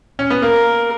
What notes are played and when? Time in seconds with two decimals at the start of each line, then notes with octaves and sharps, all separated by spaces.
0.19 C#4
0.30 B3
0.42 A#3 A#4